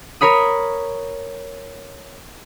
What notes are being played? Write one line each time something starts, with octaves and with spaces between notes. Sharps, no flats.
A#4 C#5 B5 D#6